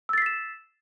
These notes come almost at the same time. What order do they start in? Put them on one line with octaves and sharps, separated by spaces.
E6 A6 C7 B6 E7